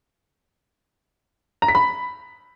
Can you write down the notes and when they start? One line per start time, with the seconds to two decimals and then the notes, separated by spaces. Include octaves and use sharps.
1.62 A#5
1.68 B6
1.75 B5